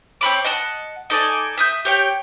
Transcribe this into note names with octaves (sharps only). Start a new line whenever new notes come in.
C4 C#5 B5 D6
D#5 F#5 A5
D#4 A4 D5 G#5
E5 D#6 G6
G4 C#5 G5